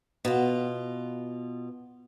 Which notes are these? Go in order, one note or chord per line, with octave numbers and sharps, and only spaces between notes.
B2 F4